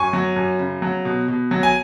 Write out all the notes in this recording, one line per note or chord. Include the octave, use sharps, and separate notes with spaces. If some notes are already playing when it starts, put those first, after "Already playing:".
Already playing: F#2 G#5 C#6
F#3
F#2
C#3
F#3
B2
B2
F#3
G#5